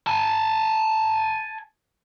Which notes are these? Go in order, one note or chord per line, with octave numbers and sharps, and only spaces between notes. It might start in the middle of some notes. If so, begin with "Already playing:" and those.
G#5 A5